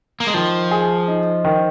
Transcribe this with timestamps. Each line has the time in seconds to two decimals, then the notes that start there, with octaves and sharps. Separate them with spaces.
0.20 A#3
0.27 G#3
0.34 D#3 F3
0.71 G#4
1.08 D#4
1.45 D#3